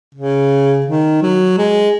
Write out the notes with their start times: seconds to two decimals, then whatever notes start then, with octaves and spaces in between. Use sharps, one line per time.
0.15 C#3
0.86 D#3
1.22 F#3
1.58 G#3